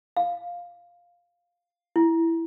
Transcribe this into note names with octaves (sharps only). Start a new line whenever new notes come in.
F5
E4